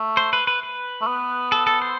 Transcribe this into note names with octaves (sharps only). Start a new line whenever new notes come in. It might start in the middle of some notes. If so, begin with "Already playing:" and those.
Already playing: A3
C5
B4
B4
B4
A3
B3
A4
A4
C5